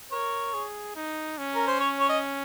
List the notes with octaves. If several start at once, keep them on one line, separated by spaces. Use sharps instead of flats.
A#4 C#5
G#4
D#4
C#4
A#4
C5
C#5
C#5
D#5